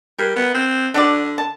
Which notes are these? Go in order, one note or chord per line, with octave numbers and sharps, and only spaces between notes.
G3 A#4
B3
C4
D3 D4 F#4 D5
A5